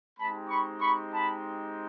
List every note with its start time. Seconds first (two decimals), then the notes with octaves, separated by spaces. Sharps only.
0.18 G#3 C4 D#4 G4 A5 B5
0.49 B5 C#6
0.81 B5 C#6
1.13 A5 B5